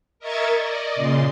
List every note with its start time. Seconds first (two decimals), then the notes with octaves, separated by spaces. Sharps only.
0.19 A#4 D#5 E5 C#6 G#6 A6
0.58 D5 D#5
0.95 A#2 C#3 C6